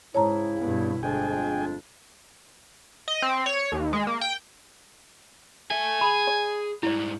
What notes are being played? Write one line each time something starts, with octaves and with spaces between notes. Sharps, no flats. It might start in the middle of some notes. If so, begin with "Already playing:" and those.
G#2 C#3 E4 C#5 A5 A#5
G2 B2 B3
G1 F2 G#3 D4 G#4 G5 G#5
D#5
C4
C#5
D#2
G#3
A#3
G5
A4 E5 G#5
G#4 B5
D5
G#2 G3 E4 D5